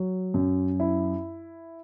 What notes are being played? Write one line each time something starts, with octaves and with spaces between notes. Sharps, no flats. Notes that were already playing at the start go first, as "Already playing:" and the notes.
Already playing: F#3
F#2
E4